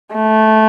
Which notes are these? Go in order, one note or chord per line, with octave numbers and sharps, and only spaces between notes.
A3